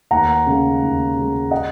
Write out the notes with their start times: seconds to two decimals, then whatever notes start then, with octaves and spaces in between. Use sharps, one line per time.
0.11 D#2 F#5 A#5
0.46 C#3 G#3
0.81 D#2
1.16 C#3
1.21 G#3
1.51 D#5 F#5